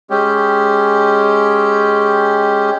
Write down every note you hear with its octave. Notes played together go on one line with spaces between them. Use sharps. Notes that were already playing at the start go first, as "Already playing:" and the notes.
G#3 C#4 G4